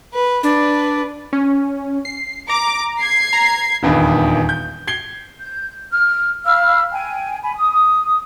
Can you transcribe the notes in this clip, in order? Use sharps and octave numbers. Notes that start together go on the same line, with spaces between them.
B4
D4 B4
C#4
C7
A#5 D6
G#6 C7
A#5
D#1 E2 G2 D#3
G6
G#6 C7 G7
G6
F6
F5 B5 E6 F6
G5 G#5
G#5 B5
D#6